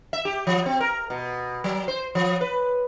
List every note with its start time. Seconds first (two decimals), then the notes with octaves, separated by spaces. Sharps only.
0.13 E5
0.25 G4
0.47 F3
0.66 C4
0.80 A#4
1.10 B2
1.64 F#3
1.88 C5
2.15 F3
2.41 B4